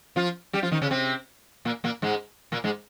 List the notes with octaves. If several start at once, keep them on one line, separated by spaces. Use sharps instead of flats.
F3 F4
G3 G4
F3 F4
D#3 D#4
C#3 C#4
C3 C4
A#2 A#3
A#2 A#3
G#2 G#3
A#2 A#3
G#2 G#3